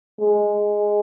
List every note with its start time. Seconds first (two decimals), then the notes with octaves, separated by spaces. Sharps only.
0.20 G#3